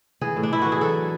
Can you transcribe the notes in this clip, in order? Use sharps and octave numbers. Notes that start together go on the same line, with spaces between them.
E3 G#4
A2
D4
E3 E4
E3 F#4
G#4
F#3 A4